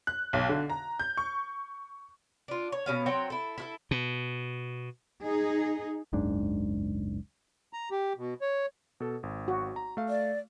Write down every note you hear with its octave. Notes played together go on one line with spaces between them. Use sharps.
F#6
B1
D3
A#5
G6
C#6
D4 F4
C#5
B2 C#4 F5
F#3 C4 C#5 G5
E4 A4
E4 F4 A4
B2
D#4 G#4
F#1 C#2 G#2 D4
A#5
G4
B2
C#5
B2 A4
G#1
F#4
A#5
A3 F5
D5